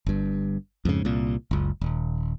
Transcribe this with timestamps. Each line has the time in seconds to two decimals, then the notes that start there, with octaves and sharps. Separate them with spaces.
0.06 G1 G2
0.85 F2 G#2 C#3
1.05 C2 A#2
1.51 F#1 C#2
1.81 D#1